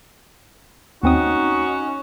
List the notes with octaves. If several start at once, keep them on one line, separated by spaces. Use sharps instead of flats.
D#2 C4 C#4 D#4 F#4 D#6